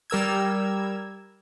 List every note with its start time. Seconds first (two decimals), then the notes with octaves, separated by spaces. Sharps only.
0.10 G3 A#4 E6 G#6